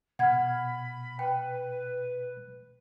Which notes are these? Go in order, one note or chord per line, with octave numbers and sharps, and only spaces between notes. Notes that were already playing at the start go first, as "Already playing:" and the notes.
B2 F#5 B5 F6 G#6
B4 G5